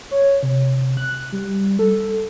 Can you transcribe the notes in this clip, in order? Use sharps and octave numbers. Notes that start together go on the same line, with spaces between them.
C#5
C3
F#6
G3
A4